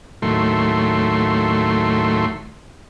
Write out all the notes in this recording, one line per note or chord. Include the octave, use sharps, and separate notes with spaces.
D#2 A2 F#3 A3 C6